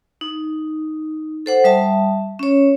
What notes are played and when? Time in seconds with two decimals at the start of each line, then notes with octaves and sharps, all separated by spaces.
0.21 D#4
1.46 A4 C5 F#5
1.64 G3 E5 A5
2.39 C#4 C#5